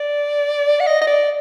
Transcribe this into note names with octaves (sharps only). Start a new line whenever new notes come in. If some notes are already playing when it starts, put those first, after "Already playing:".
Already playing: D5
F#5
D#5
D#5
D5